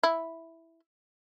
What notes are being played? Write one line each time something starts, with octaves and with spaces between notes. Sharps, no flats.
E4